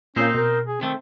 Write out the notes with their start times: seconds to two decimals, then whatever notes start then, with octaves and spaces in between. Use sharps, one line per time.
0.16 A#2 A#3 C4 C#4 D#4 C5
0.34 B2 A#4
0.67 G#4
0.81 D#3 A3 C4